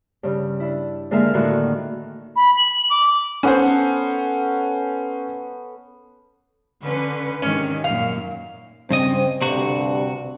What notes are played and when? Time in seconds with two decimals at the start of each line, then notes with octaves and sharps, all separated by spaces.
0.23 G2 C#3
0.60 D4 E4
1.11 D3 G#3 A#3 A#4 E5 F5
1.34 A2 D3 D#3 F#4 F#6
2.36 B5
2.57 F#7
2.90 D6
3.43 B3 C#4 A4 C5 F#5
6.82 D3 C#4 B4
7.42 G#2 C3 D#3 C#4
7.84 F#2 A#2 F5
8.91 G2 C#3 C4 D#5
9.42 D2 G2 C3 F#4